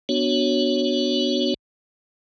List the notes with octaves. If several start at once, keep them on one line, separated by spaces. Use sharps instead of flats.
B3 D4 F#4 C#5